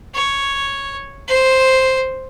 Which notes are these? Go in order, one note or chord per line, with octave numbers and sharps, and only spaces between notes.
C#5
C5